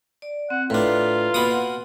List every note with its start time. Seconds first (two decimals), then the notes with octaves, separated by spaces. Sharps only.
0.22 D5
0.50 C4 F#5
0.70 A2 D4 F4 B4 A#5
1.34 B2 A#3 F#4 B5 D#6
1.51 F#5